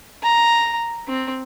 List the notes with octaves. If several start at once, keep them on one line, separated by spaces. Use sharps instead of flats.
A#5
C4